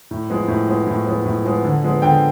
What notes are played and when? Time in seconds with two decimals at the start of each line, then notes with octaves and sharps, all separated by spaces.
0.11 A2
0.29 F3 G#3 B3
0.48 A2
0.68 F3 G#3 B3
0.87 A2
1.06 F3 G#3 B3
1.25 A2
1.45 F3 G#3 B3
1.64 D3
1.84 F3 G#3 B3
2.02 D3 G5